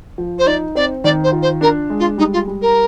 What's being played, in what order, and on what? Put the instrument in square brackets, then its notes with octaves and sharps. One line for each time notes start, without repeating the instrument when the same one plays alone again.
[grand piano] F3
[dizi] C5
[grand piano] D#4 [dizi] D5
[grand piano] C4 [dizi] D5
[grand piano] D#3 [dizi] D5
[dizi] C5
[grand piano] F4
[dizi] C5
[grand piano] D4 [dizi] A#4
[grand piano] G#3
[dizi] F4
[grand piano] G3 [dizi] D#4
[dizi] F4
[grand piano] G3
[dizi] A#4